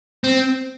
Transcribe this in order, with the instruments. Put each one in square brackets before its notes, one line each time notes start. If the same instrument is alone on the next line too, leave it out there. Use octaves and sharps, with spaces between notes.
[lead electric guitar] C4